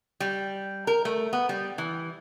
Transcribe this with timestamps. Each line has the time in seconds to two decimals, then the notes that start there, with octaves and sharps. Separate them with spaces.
0.20 G3
0.87 A#4
1.05 A3
1.33 B3
1.49 G3
1.78 E3